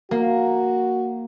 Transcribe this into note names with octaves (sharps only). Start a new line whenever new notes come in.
A#3 F#4